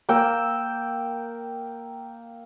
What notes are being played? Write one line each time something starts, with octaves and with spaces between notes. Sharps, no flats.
A#3 G5 E6